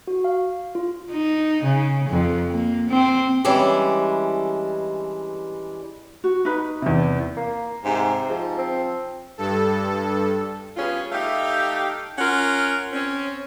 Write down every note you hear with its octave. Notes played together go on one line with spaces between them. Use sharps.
F#4
F5
F4
D#4
C#3
F2
A#3
C4
E3 G3 G#3 C#4 D4
F#4
D#4 B4
E2 C3
A#3
G#2 C3
G#2 F3
C4
G2 A4
G3 B3 C#4 F4 G#4
A3 D#4 G4 E5 F5
C#4 F4 A#4 F#5
C4 C#4